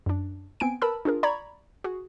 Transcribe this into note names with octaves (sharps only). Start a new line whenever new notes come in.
F#2 D4
B3 C4 G#5 D7
A#4 B4 A5 B5 E6
D4 F4 G#4 A#4
D5 A#5 B5 C#6 G#6
F#4 G#4